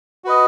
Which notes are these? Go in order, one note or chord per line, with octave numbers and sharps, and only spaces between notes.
F#4 B4 D#5